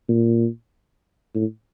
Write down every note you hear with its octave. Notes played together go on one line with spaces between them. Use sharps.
A#2
A2